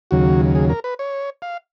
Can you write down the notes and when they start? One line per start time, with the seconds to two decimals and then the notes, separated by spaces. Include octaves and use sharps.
0.11 D#2 C#3 F#3 F#4
0.55 G#4
0.69 A#4
0.84 B4
0.99 C#5
1.42 F5